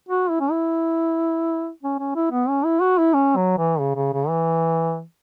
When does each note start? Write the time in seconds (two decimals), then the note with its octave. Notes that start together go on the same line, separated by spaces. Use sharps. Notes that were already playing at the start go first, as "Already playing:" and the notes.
0.09 F#4
0.30 E4
0.40 C#4
0.51 E4
1.83 C#4
1.99 C#4
2.16 E4
2.32 B3
2.48 C#4
2.65 E4
2.81 F#4
2.98 E4
3.14 C#4
3.36 F#3
3.58 E3
3.80 C#3
3.96 C#3
4.13 C#3
4.29 E3